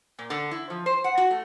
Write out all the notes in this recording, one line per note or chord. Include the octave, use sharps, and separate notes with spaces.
A#2
D3
E4
F3
C5
F#5
F#4
A3